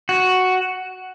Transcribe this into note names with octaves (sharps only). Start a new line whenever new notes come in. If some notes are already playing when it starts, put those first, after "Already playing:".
F#4